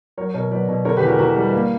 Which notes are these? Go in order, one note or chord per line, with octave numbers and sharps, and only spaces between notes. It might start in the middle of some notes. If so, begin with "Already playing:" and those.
F#3 A#4 C#5
B2 A#4 C#5
F#3 B4 D5
B2
D3 A#4 C#5
G4 B4
E2
F#4 A#4
E2 F#4 A#4
G3
A#3